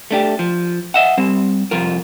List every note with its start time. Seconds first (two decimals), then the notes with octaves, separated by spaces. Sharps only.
0.11 A3 D4 G4
0.39 F3
0.94 D#5 E5 F#5
1.17 G3 C4
1.71 C2 F2 F4 A#4